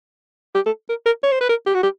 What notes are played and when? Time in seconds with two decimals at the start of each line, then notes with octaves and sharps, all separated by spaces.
0.55 G4
0.66 A4
0.89 A#4
1.06 A#4
1.23 C#5
1.32 C5
1.41 B4
1.49 A#4
1.66 G4
1.74 F#4
1.83 G4